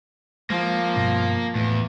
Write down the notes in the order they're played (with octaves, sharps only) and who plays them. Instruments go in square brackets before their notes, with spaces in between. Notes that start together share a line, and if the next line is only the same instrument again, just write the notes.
[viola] F3 [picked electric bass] G#3 [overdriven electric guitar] A#3
[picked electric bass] G2 B2 C4
[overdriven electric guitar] E2 [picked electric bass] A2 A3